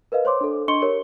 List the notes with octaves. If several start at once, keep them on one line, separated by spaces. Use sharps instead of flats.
A#4 B4 D#5 F5
C5 C#5 C6 D6
D4 A4
D4 D#5 C6 C#6 C#7 G7
G4 A#4 C#5